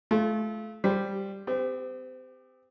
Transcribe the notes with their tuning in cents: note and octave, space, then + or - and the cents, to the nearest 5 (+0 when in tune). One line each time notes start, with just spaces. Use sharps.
A3 -30 F4 -25
G3 +0 C5 +0 G5 +0
C4 -35 G4 +20